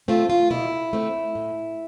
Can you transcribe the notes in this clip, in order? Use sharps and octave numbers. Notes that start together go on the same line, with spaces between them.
A3 C4 F4
F4
B2 E4
A3 C4
A2